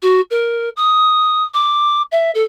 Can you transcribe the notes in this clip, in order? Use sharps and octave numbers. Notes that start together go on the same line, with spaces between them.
F#4
A#4
D#6
D6
E5
A4